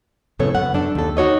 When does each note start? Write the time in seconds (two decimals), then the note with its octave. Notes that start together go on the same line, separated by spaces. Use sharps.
0.39 F#2 A2 C#3 B3 A4 C#5
0.55 F#2 C#3 B3 F#5
0.74 F#2 D4 A4
0.95 D#2 A4
1.17 D#4 F#4 C#5 D#5